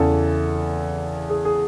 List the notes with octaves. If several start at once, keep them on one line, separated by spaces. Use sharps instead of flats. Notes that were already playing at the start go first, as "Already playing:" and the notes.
Already playing: E2 C#3 E3 A4
G#4
G#4